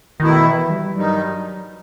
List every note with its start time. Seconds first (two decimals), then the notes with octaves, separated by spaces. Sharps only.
0.20 B2 D#3 A3 E4
0.45 E3
0.70 G3
0.95 G2 D#3 F#3 G3 D#4